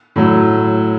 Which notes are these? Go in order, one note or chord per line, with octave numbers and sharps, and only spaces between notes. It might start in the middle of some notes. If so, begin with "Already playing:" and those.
A2 F#3